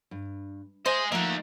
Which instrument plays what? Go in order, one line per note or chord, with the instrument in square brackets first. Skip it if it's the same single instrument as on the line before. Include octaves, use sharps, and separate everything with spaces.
[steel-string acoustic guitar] G2
[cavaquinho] C5 [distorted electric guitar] D#5 G#5 [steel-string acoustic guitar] E5
[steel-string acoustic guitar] F3 A3 E4 [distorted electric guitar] A#3 D#4 [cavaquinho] E5 F#5